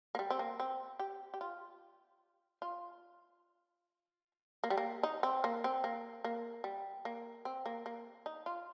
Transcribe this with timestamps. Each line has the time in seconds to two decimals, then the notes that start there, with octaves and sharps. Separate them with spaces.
0.15 A#3
0.19 G3
0.30 C4
0.39 A#3
0.60 C4
0.99 G4
1.34 G4
1.41 F4
2.62 F4
4.64 A#3
4.70 G3
4.77 A#3
5.03 D#4
5.23 C4
5.44 A#3
5.64 C4
5.84 A#3
6.24 A#3
6.64 G3
7.05 A#3
7.45 C4
7.66 A#3
7.86 A#3
8.26 D#4
8.46 F4